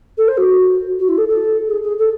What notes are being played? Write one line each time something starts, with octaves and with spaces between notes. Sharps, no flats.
A4
C5
F#4
F#4
E4
A4
A4
G#4
G#4
A4